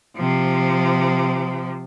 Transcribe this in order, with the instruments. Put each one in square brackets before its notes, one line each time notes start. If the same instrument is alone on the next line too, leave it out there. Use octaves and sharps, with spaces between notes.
[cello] C3 F3